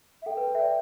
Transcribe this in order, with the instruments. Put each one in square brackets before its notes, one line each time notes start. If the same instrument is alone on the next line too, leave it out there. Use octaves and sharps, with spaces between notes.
[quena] E5
[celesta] A4 [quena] G5
[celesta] B4
A4
E5
D5